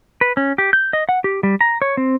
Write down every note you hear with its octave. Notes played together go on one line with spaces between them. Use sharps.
B4
C#4
G4
G6
D#5
F#5
G4
G3
A#5
C#5
C4